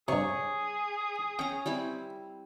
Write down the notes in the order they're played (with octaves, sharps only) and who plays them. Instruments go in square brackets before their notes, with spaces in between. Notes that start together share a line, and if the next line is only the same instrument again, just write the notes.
[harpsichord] G2 C3 [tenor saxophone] G#4 [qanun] C#5
[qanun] C#4 A#5 [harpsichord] G5
[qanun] G3 C4 E4